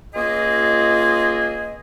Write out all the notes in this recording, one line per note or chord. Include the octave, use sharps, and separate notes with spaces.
C#2 A#3 F4 G#4 D#5